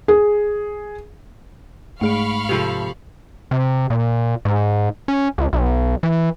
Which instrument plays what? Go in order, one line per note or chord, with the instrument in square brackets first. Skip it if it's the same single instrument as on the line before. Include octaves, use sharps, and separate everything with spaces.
[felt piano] G#4
[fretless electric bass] G#2 [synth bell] A3 G#4 D7 [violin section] F5 B5 C#6
[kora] C3 F3 A4 [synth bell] F7
[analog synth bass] C3
A#2
G#2
C#4
C#2
B1
E3